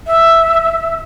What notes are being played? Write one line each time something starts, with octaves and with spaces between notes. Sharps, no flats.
E5